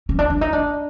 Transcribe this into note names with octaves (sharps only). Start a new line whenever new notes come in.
C#4
D4
D4
D#4
D4